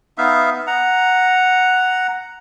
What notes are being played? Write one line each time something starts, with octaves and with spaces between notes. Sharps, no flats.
B3 D#4 E5 F5
F#5 A#5